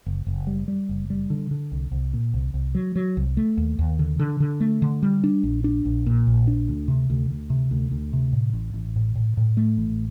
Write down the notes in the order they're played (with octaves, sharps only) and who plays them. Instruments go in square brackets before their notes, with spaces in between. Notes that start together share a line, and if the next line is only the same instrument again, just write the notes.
[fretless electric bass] F#1
F#1
G3
G3
F#1
G3
D3
D3
C2
C2
A#2
C2
C2
F#3
F#3
C2
A3
D#2
D#2
D3
D3
D3
A3
D3
G3
D4
A#1
D4
A#1
A#2
A#1
D4
D2
C3
D2
D2
C3
D2
D2
C3
A2
A1
A1
A2
A2
A2
A3
A1